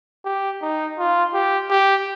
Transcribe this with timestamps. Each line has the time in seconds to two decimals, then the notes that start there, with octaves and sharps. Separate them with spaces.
0.25 G4
0.62 D#4
0.99 F4
1.34 G4
1.70 G4